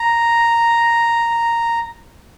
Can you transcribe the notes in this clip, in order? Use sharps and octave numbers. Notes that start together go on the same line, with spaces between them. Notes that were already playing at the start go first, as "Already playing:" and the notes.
Already playing: A#5